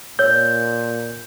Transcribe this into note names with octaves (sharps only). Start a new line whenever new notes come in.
A#2 C#5 E6 G6